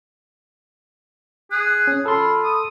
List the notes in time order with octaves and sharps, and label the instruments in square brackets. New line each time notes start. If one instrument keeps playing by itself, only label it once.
[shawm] G#4 [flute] F#6
[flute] F#6
[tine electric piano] C#4
[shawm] F4 [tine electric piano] A4 C6 [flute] B5
[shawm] D#6